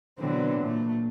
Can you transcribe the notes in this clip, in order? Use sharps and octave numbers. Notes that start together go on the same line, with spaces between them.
B2 D3 E3 F#3 C4
A#2 A3